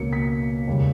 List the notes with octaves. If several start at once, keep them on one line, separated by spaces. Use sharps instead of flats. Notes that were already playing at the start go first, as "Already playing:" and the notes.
Already playing: C#2 B2 A#3 C#4 C#7
B6
D#2 C#3 G3